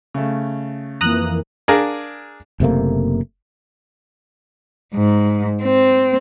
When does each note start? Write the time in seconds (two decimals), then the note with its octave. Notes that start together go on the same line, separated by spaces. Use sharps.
0.14 C#3 A3
1.01 F2 E3 A#3 A#5 D#6 F#6
1.68 D4 G#4 A#4 F5 A#5
2.60 F#1 C3 A3 A#3
4.94 G#2
5.63 C4